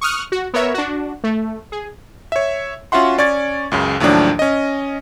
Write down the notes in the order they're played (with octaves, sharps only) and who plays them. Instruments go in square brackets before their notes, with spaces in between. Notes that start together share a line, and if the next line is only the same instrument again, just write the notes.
[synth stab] C#6 D#6 F6 F#6
F#4
B3 A#4 C#5 E5
D4 F#4
A3
G#4
[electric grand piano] C#5 E5
C#4 F4 F#4 E5 F#5 C6
C#4 D5 C#6 G#6 A6
C#2 F#2 C#3
D#2 A2 F3 F#3 D4
C#4 D#5